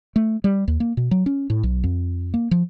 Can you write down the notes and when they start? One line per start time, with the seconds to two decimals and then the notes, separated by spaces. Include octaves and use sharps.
0.16 A3
0.44 G3
0.68 D#2
0.80 A#3
0.97 B2
1.11 F#3
1.26 C#4
1.50 A2
1.63 B1
1.84 F2
2.34 A#3
2.51 F3